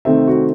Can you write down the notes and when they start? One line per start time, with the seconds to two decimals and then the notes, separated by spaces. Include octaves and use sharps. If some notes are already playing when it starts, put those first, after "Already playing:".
0.05 C3 D#3 A3 C4 E5
0.27 F#4